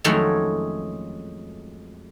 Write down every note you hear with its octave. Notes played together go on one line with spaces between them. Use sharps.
F2 D#3 F#3 G#3 A3 C#4